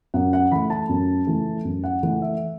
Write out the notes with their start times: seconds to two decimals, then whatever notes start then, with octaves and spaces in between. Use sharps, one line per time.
0.14 F#2 F#5
0.33 F#5
0.52 E3 A3 B5
0.70 A5
0.89 F#2
1.27 E3 A3
1.65 F#2
1.84 F#5
2.03 E3 A3 F#5
2.22 E5